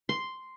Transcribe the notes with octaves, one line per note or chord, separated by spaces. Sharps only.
C6